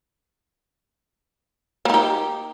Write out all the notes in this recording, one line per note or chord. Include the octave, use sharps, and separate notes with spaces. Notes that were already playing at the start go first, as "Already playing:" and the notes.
A#3 D#4 G4